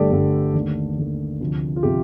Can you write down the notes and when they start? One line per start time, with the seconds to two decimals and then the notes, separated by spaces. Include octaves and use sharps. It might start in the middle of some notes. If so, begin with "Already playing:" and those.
Already playing: G1 G2 D3 A3 G4 A4 D5
0.12 G1 G2 D3 A3
0.54 D#2 D3 A3
0.98 D#2 D3 A3
1.41 D2 C3 F3
1.76 F4
1.83 C3 F3 G4